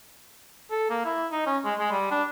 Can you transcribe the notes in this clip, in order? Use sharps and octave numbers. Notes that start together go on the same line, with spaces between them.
A4
A#3
E4
D#4
C#4
G#3
G#3
G3
D4